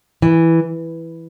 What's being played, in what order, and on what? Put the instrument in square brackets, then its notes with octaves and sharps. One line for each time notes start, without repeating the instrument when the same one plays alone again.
[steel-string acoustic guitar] E3